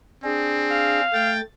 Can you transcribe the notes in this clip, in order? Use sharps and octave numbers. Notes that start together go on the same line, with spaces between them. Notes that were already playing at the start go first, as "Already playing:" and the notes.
C4 D4 G#4
F5
A3 G5 A6